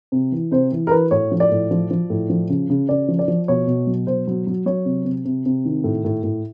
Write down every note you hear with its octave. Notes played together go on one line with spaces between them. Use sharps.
C3
E3
C3 C5
E3
A#4
E3 B4
A2 C#5
F3
D5
A2
F3
F3
A2
F3
C#3
C#3
C#3 D5
F3
D5
F3
B2 C#5
B2
F#3
B2 C5
F#3
F#3
F#3 C#5
C3
C3
C3
C3
D#3
A2
A2
A2